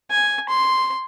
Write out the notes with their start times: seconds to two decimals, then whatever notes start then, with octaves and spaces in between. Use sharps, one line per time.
0.11 G#5
0.49 C6